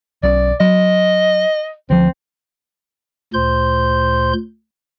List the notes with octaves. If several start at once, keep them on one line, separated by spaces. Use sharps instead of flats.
B1 C#4 D5
F#3 D#5
D2 F3 C4
D2 A#2 C5 C6 G6